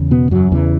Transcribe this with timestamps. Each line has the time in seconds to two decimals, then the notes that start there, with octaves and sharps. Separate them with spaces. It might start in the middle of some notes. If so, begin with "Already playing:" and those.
Already playing: E2 C#3
0.11 B2 B3
0.31 F#2 F#3
0.52 E2 C#3 E3